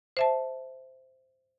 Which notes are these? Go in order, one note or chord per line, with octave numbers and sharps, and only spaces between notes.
C5 E5 A5